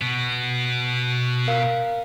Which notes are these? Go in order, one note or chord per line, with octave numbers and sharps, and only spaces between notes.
B2 B3
A#4 F5